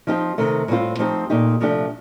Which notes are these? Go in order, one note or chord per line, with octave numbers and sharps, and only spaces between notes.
F3 C4 D#4 G4
C3 D#3 A3
A2 G3 C4 F4
F3 A3 C4 D#4 G4
A#2 A3 D#4 G4
C3 F3 A3 D4 G4